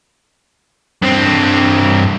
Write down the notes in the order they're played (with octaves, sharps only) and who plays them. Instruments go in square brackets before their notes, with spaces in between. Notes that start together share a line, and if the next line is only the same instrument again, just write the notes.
[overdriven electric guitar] G2 C4